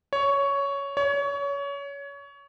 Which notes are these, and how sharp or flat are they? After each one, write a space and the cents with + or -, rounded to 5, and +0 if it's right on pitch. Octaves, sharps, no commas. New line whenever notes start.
C#5 +10
C#5 +25